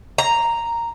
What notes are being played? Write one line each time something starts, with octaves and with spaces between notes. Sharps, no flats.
A#5